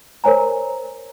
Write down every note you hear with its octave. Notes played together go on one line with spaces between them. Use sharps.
A#4 C5 C#5 G#5 A#5